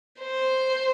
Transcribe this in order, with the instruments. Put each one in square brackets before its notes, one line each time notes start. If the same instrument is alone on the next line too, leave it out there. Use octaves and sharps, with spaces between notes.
[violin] C5